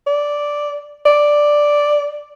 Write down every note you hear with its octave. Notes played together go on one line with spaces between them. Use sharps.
D5
D5